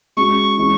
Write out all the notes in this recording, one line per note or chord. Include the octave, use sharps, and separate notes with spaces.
G#3 C#4 F#4 C#6
E3 G#3 C#4